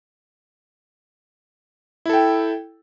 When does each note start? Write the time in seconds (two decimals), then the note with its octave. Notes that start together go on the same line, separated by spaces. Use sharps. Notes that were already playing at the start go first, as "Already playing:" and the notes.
2.06 E4
2.09 A4
2.13 G5